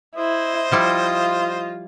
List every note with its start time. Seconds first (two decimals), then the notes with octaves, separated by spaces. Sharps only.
0.16 E4 C5 D#5
0.72 F3 G3 E4 F4